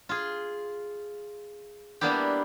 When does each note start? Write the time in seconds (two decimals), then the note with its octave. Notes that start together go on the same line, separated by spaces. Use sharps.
0.09 F4 G#4
2.01 G3 A#3 B3 D4 E4 G4